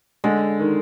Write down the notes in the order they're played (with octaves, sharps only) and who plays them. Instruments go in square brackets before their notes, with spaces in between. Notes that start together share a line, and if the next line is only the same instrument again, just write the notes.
[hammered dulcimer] D3 [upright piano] G#3
[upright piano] D#3